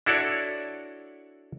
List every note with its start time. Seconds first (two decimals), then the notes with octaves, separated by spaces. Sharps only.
0.06 D4 E4 F#4 A4 C#5 D5